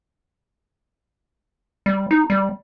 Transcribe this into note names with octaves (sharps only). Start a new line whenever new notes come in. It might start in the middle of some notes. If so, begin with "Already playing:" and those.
G3
D#4
G3